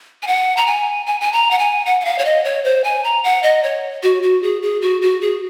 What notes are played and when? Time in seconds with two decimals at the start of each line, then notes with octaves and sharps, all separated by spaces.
0.23 G#5
0.27 F#5
0.57 A#5
0.66 G#5
1.06 G#5
1.21 G#5
1.33 A#5
1.51 F#5
1.59 G#5
1.86 F#5
2.01 F#5
2.05 F5
2.19 C#5
2.25 D#5
2.45 C#5
2.64 C5
2.84 G#5
3.04 A#5
3.24 F#5
3.43 D#5
3.64 C#5
4.03 F#4
4.23 F#4
4.43 G#4
4.62 G#4
4.82 F#4
5.02 F#4
5.21 G#4